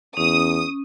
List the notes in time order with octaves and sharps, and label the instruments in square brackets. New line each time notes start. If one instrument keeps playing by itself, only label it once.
[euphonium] E2 [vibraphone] C#4 [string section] D#6